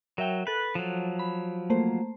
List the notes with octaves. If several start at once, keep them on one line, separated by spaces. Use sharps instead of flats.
F#3 A#4 E5 G5
A4 B4 F#6
F3 F#3
B5
A3 A#3 C5